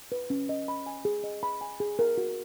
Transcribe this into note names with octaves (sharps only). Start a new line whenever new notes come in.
B4
C#4
D#5
B5
G#5
G#4
D#5
B5
G#5
G#4
A#4
F#4